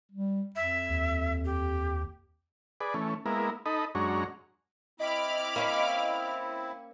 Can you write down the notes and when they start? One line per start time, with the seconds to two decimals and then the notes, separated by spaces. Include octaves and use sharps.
0.12 G3
0.56 F2 E5
0.89 D#2
1.45 G4
2.81 G#4 B4 D5
2.94 E3 A3 C#4
3.26 G#3 A#3 B3 E4 A#4
3.66 D#4 A4 D#5 B5
3.95 F#2 G#3 D4 F#4 C#5 A#5
5.00 C4 E4 D#5 B5 D6 F6
5.56 A#3 C#4